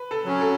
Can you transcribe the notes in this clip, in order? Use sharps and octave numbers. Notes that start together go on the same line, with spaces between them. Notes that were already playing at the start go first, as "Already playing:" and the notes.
Already playing: B4
A4
F#3 C#4
A4